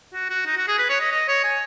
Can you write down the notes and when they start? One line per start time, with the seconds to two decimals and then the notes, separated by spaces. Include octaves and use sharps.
0.14 F#4
0.29 F#4
0.46 D#4
0.57 F#4
0.68 G#4
0.78 B4
0.89 C#5
1.00 D#5
1.12 D#5
1.28 C#5
1.44 G#5